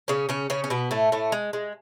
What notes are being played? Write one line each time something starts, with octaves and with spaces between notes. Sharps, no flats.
C#3 C#4
C#3 C#4
C#3 C#4
C#4
B2 B3
A2 A3
A2 A3
G#3
G#3